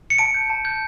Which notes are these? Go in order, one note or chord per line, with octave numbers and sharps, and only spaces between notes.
C#7
A5 D7
G6
A5
G6